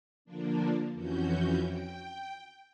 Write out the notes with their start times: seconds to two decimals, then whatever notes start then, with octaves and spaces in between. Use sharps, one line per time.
0.25 D3 F3 A#3 D4
0.93 F2 E3 C#4 F#4 G6
1.63 G5